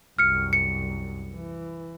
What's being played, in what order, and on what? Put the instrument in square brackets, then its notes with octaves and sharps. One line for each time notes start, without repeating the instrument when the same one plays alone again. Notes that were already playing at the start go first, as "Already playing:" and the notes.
[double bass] C2 F#2 [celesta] F6 C#7
[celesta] C#7
[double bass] E3